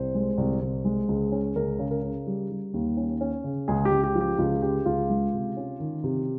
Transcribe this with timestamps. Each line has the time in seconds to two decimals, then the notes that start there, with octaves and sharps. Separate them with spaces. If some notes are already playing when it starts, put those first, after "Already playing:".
Already playing: C2 C5
0.15 G#3
0.38 C2
0.61 C2
0.85 G#3
1.09 C#2
1.32 C#4
1.56 C#2 A#4
1.79 C#3
1.91 A#4
2.02 C#3
2.27 G3
2.50 G3
2.74 D#2
2.97 C#4
3.21 C#4
3.44 C#3
3.68 C#2 G#4
3.85 G4
3.91 C#2
4.04 G4
4.15 F3
4.21 G4
4.38 C#2 F4
4.62 C#3 G4
4.86 C#2 F4
5.10 G#3
5.33 C3
5.57 C#4
5.80 D#3
6.04 C3